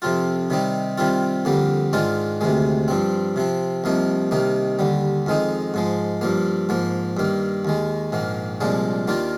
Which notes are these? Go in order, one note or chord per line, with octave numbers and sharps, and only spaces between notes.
F2 C3 F3 C4 F4
C3 D#3 G3 C4 D#4
C3 D#3 G3 C4 F4
F2 D3 G3 A#3
G#2 D#3 G#3 D4 F4
D2 C3 D#3 G#3
G2 F3 C4
C3 F3 C4
C2 C3 F3 A#3 D#4
C2 C3 D#3 A#3 D#4
D#2 D3 G3
F2 D#3 G#3 D#4
G#2 F3 G#3
G2 F3 A#3
G#2 F3 A#3
G2 D#3 A#3
D#2 D#3 G#3
A#1 G#2 D#3 A#3
C2 A#2 F3 G#3 D4
D#2 D#3 A#3 D4 F4